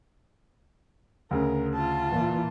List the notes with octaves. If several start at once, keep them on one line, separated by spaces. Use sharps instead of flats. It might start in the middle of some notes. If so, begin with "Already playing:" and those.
D2 C#3 A#4
F4 A5
A#2 E3